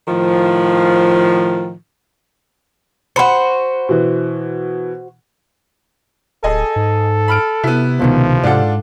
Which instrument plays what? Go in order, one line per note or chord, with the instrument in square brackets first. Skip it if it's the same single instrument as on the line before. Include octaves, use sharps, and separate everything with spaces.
[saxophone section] A2 D#3 F3
[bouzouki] F#4 C5 [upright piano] F#5 B5 C#7
[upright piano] B2 E3
[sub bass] D1 [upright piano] G#4 D#5 G#5 [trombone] A4
[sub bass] G#2
[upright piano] B5 F6 D7
[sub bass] C3 [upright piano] B3 E4
[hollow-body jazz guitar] C#2 B2 D#3 [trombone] F3
[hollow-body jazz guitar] G#2 F#5 [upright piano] D4 F4 A4